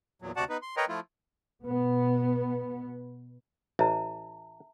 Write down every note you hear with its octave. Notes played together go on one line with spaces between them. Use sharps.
E2 A#2 F#3
D2 C3 F#4 D5 F#5 A5
B3 D#4 B4
C6
A#4 B4 C#5 D#5 G5 A#5
F3 A3 E4 F4
B2 B3
A1 E5 A5 A#5